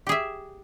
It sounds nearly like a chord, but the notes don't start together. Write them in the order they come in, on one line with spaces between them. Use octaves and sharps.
G4 G#4 E5